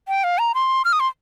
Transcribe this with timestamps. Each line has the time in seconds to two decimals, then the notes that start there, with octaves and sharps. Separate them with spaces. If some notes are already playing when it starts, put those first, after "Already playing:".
0.08 G5
0.24 F5
0.38 A#5
0.55 C6
0.85 F6
0.93 D#6
1.00 C6